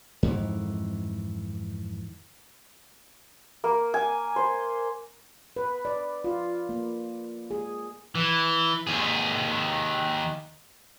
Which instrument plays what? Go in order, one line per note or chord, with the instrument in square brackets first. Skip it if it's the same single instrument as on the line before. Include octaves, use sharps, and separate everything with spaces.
[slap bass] F2 G#2 D#3 E3
[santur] A#3
G#5
C5
[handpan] B4
D5
F4
A#3
G#4
[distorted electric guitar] E3
D#2 G#4